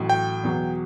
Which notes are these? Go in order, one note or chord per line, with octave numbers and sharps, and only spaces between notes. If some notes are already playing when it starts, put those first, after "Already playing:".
Already playing: A1 A2 F#3
G5
E2 B2 F#3